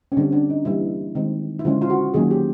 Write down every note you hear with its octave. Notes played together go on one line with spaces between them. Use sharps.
C#4
D3 G3 C4 D4
D4
D#4
E3 G3 A#3 E4
D#3 G#3 C4
E4
D3 F3 G#3 C#4 F4
F4
F#4
D#3 F#3 A#3 C#4 G#4
G4